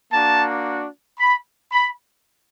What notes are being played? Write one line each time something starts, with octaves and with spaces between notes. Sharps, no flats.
A#3 D4 F#4 A5
B5
B5